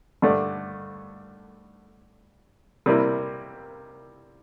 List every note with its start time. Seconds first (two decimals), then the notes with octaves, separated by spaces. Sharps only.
0.22 G2 D3 A3 D4
2.86 C3 G3 A#3 E4